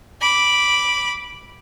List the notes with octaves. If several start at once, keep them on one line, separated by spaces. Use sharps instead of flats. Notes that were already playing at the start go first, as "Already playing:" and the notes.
B5 D6